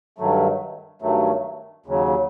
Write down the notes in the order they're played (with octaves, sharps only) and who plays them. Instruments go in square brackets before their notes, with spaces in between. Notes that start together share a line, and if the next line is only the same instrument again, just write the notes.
[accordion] G2 D#3 F#3 A3
G2 D#3 F#3 A3
D#2 C#3 F#3